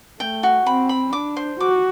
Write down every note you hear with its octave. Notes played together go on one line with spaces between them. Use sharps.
A3 G5
F#4
C4 B5
B5
D4 D6
C5
F#4 D6